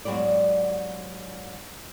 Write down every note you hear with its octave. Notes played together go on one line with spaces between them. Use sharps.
G#2 F#3 G3 B3 D5